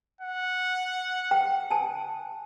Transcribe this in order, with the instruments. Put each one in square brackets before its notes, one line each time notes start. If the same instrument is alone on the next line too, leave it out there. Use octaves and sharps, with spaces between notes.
[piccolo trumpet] F#5
[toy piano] G5
G#5 A5